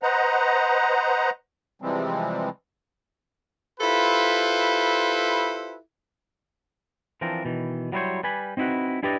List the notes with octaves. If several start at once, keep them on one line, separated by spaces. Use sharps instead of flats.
B4 C5 D#5 F#5 A#5
C3 E3 F3 G3 G#3 C4
E4 F4 G4 A4 B4 C5
E3 F3 C4 D4 A#4
B2 D#3 E3
F#3 G3 E4 F4 C5 C#5
G3 B4 G#5 B5
C4 D#4 E4 F#4 B4
D4 E4 G4 B4 D5 D#5